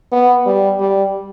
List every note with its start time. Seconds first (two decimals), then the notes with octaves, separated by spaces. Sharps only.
0.12 B3
0.46 G3
0.80 G3